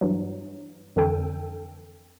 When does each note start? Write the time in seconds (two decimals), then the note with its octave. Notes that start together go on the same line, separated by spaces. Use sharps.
0.01 G2 E3 F#3
0.96 F2 D3 E3 A4 G5